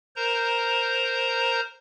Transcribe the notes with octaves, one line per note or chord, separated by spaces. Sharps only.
A#4 C5 A#5